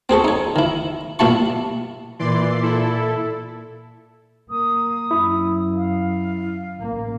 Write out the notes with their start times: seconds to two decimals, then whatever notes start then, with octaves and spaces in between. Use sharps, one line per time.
0.09 C4 G#4 A4 C#6
0.24 D#4 C#5
0.56 D#3 E4
1.19 A#2 G3 E4 A5 C#6
2.19 A#2 E3 D5 C6
2.63 E4 A4
4.50 A#3 D#6
5.11 F#2 E4
5.75 F5
6.76 A1 A#3